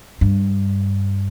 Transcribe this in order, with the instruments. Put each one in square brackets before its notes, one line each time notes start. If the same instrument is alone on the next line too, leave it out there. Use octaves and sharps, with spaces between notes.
[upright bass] G2